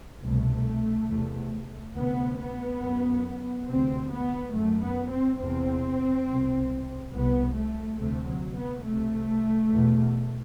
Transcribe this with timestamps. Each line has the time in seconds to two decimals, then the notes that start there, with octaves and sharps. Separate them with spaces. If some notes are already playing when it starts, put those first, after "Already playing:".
0.22 C2 B2 A3
1.09 E2 C3
1.95 D2 C3 B3
2.38 B3
2.81 F#2
3.67 D2 C3 C4
4.11 B3
4.53 F#2 A3
4.82 B3
5.11 C4
5.40 E2 C3 C4
6.26 C2 B2
7.12 C2 C3 B3
7.55 A3
7.98 D2 C3 A3
8.27 F#3
8.56 B3
8.85 C2 C3 A3
9.71 E2 B2